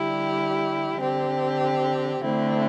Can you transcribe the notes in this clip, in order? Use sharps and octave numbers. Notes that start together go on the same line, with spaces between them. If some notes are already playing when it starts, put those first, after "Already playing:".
Already playing: D3 G3 E4 G4
D3 C4 G4
D3 A3 C4 E4